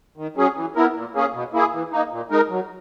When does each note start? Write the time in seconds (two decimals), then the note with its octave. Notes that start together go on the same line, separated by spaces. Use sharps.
0.17 D#3
0.37 F#3 C#4 G#4
0.56 E3
0.76 B3 E4 A#4
0.95 A#2
1.14 A#3 C#4 G#4
1.34 B2
1.53 A#3 E4 G#4
1.73 E3
1.92 A#3 D#4
2.11 A#2
2.31 G#3 D#4 A#4
2.50 F#3